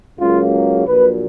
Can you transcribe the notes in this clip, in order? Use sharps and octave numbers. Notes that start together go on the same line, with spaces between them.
C#2 C#3 F#3 A#3 F4
A#1 A#2 F#3 B4